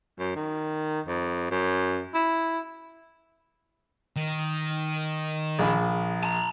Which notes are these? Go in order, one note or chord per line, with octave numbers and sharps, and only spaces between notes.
F#2
D#3
F2
F#2
E4
D#3
A#1 G#4 B5
A5 A#5